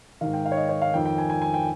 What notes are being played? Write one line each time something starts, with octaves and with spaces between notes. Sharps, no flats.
G#2 D#3 F5
G5
F5
C#5
D#5
C#5
F5
F2 D#3 G5
G5
G#5
G#5
G#5
G5